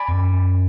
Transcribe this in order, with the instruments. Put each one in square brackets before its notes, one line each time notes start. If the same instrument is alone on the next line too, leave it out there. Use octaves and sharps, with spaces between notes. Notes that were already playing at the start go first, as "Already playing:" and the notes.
Already playing: [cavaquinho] D5 G#5 B5
[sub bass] F2
F#2